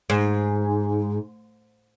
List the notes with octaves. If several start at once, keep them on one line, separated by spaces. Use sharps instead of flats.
G#2